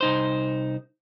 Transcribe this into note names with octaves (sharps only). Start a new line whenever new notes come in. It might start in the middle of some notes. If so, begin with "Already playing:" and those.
C2 D#4 C5